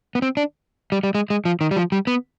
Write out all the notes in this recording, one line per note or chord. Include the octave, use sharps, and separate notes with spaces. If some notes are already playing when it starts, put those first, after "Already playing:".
B3
C4
D4
G3
G3
G#3
G#3
F3
D#3
G3
F3
G3
B3